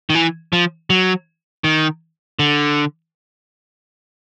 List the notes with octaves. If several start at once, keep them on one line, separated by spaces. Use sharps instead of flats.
D#3
E3
F3
F#3
D#3
D3